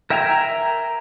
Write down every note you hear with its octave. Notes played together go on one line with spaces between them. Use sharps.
A#4 E5 G5 G#5 A#5